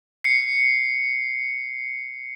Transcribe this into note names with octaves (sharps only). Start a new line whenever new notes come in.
C7 C#7